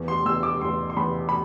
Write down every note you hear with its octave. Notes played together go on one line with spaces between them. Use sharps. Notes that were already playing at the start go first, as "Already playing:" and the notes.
Already playing: E2
C6
E2 E6
D6
E2 C6
C6
E2 B5
B5